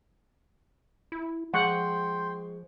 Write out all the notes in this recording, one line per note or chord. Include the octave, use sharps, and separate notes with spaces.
E4
F3 G#3 F#5 G5 C6 C#6 G6